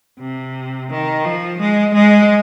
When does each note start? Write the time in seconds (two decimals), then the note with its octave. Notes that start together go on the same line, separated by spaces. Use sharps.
0.20 C3
0.90 D#3
1.24 F3
1.60 G#3
1.94 G#3